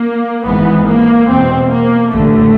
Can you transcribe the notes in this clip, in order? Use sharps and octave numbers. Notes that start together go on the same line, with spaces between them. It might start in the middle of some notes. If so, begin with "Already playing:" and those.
Already playing: A#3
G#1 G#2 E3 B3
A#3
E2 B2 C4
A#3
A1 G2 D3 A3